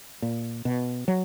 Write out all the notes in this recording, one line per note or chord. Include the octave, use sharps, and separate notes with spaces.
A#2
B2
F#3